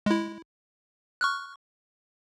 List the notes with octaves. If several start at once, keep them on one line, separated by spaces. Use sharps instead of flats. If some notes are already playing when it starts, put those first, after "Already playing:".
G#3 E4
C#6 F6 F#6